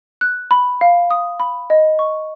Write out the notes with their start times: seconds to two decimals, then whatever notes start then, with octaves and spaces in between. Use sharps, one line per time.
0.21 F#6
0.51 B5
0.81 F5
1.11 D#6
1.40 B5
1.70 D#5
1.99 C#6